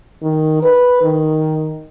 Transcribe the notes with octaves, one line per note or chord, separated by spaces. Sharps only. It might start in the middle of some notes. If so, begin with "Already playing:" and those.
D#3
B4
D#3